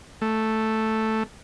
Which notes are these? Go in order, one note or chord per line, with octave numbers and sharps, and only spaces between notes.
A3